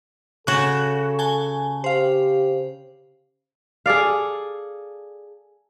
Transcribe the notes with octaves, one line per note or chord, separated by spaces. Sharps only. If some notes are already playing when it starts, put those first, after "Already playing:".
C#3 F#4 A4 F#6 G#6 E7
G#5 A5 G7
G4 C5 F5
G#4 A4 D5 F5